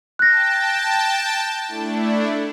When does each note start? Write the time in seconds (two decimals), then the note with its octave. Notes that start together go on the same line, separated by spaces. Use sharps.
0.19 G5 A5 F#6 A#6
1.68 A3 D4 E4